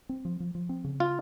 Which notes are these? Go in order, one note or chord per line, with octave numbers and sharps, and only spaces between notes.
C4
F3
F3
F3
C4
C#3
F4